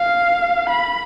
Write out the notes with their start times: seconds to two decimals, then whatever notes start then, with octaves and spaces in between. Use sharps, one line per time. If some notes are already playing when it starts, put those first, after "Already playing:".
Already playing: F5
0.70 B5